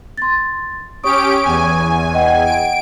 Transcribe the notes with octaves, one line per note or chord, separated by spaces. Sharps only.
C6 A6
C#4 G4 C#5 C#6 D#6 D7
E2 G#5
D#5 F#5 G5
D7